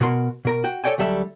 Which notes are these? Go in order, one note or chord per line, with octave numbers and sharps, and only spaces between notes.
B2 F#4 A#4 C6
B2 A#4 A#5
F#4 G5
A4 C#5 D5 G5 G#5
D2 F#3 G3 A4 E5